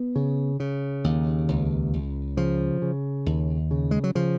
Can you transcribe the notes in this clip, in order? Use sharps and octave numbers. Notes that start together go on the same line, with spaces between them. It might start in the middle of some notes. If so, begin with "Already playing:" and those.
Already playing: B3
C#3
C#3
D#2
C#2
C#2
C#3 F3
C#3
D#2
C#3
G#3
F#3
C#3 F3